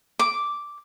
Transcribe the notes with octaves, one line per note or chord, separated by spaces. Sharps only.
D6